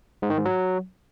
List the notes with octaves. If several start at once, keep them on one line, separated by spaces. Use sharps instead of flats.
G#2
D#3
G#2
F#3